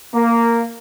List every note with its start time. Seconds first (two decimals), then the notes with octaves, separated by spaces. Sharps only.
0.14 A#3